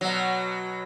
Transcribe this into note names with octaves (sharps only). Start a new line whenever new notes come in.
B2 F#3